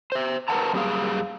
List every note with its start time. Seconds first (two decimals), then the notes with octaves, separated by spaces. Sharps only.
0.12 C5 E5
0.48 A#4 B4 F#5 A5 A#5
0.74 F#2 G3 A#3 B3 G#4 F5